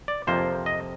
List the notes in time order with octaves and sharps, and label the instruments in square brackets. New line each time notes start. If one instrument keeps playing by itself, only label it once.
[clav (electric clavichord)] D5
F2 C3 F3 A#3 C5
D#5